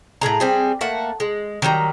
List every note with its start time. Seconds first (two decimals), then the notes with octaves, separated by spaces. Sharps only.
0.21 A2 D#3 G#4 A#5
0.40 G3 C4 G#4
0.81 A3 A#3 F#5
1.20 G#3
1.62 D#3 F#3 G3 A#5